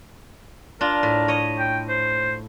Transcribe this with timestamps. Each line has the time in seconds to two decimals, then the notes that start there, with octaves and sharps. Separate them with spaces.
0.81 D4 F4 A#4
1.03 A2
1.28 C#5 D#5
1.59 G5
1.89 C5